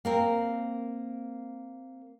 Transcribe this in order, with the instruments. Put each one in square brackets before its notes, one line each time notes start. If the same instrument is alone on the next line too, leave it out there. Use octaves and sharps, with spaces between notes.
[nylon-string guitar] A#3 C4 A#4